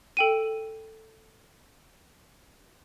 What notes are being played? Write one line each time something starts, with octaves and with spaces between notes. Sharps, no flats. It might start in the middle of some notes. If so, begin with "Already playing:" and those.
A4 G5 D#7